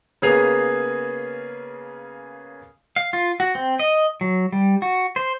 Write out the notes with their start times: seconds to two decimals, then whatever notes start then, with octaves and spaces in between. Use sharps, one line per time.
0.22 C#3 A#3 B3 G#4 C7 F7
2.96 F5
3.13 F4
3.40 F#4
3.55 C4
3.79 D#5
4.21 F#3
4.52 G3
4.82 F#4
5.16 C5